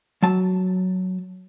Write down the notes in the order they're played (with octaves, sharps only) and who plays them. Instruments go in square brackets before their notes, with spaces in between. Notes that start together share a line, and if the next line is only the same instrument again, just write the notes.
[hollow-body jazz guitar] F#3 A5